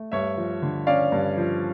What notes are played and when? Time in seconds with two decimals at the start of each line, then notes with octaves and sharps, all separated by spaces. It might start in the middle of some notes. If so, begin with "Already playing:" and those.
Already playing: A3
0.12 G2 C#5 E5
0.37 F3
0.62 D3
0.87 C#4 D5 F5
1.12 G2
1.37 F3